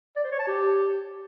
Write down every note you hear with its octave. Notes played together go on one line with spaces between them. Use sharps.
D5
C5
C#5
A5
G4